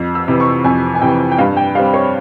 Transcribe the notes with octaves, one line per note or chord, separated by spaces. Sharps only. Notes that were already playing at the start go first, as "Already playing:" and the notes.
Already playing: F2
E6
C3 E3
C#6
F2 G#5
G#5
C3 E3 G5
G5
G2 F5
G5
G3 C4 F5
C#5